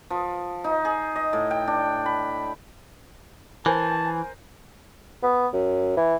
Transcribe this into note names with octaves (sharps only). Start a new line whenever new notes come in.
F3
D#4
G#4
D#5
A2
G5
D4
B5
E3 A#4 C5 G#5 A5
B3
F#2
E3